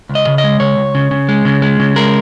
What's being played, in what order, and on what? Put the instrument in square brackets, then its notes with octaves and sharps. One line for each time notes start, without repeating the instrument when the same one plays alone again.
[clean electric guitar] C#2
D#5
C#3
D#5
G#3
C#3 C#5
C#2
C#3
C#3
G#3
C#3
G#3
C#3
G#3 A#4